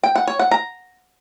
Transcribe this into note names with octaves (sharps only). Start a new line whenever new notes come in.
G5
F#5
C#5
F#5
A#5